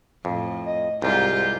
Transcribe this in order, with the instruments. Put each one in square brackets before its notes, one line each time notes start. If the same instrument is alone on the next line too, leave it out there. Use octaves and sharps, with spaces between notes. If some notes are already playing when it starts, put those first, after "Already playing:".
[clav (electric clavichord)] F2 [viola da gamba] A2
[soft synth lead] D#5
[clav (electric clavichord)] C2 G#2 [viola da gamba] G#3 F4 G4 [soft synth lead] G6